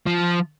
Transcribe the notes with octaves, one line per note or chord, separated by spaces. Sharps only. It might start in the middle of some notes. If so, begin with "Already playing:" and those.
F3